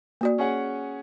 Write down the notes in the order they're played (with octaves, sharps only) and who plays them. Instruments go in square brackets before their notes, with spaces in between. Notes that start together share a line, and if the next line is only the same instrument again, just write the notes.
[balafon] A#3 F#4 D5
[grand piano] C#4 G#4 F#5